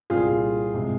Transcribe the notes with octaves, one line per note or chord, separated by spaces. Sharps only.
C2 A#2 G3 C4 F4 G#4
C3 F3 G#3